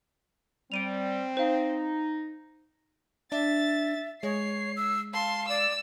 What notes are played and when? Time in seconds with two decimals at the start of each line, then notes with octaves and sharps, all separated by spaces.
0.72 G3 C4 D7 D#7 F7
1.37 D#4 C5 F5
3.32 D4 E5 A6
4.23 G#3 C#5 C7
4.77 E6
5.14 F5 A5 C6
5.49 D5 E6